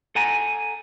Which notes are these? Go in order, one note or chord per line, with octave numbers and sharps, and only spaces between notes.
A4 F#5 G#5 A#5